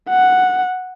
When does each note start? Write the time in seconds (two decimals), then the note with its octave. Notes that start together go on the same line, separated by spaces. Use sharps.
0.10 F#5